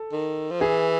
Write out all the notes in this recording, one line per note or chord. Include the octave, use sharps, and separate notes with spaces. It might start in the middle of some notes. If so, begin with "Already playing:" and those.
Already playing: A4
D#3
F3
E3 G#4